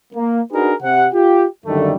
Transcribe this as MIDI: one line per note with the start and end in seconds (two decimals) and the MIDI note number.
0.14 0.41 58
0.51 0.73 62
0.51 0.73 63
0.51 0.73 66
0.51 0.73 68
0.51 0.73 70
0.51 0.73 71
0.82 1.07 48
0.82 1.07 78
1.13 1.47 65
1.13 1.47 67
1.66 1.94 42
1.66 1.94 50
1.66 1.94 51
1.66 1.94 55
1.66 1.94 57